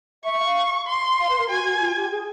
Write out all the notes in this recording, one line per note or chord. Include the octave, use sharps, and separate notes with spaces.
E5 C#6
F5
C6
F5
B4
A#4
F#4 G#5
F#4
F4
G4
G#4